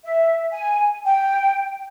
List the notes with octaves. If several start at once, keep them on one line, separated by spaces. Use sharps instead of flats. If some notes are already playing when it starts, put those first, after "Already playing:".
E5
G#5
G5